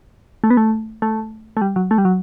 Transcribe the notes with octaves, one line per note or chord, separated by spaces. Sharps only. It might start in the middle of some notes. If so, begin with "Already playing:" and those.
A3
B3
A3
A3
A3
G3
F#3
A3
G3
F#3